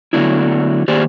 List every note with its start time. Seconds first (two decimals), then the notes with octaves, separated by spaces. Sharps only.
0.13 D3 F#3 A3 B3 D4 E4
0.88 D#3 A#3 G4 G#4 C5 D5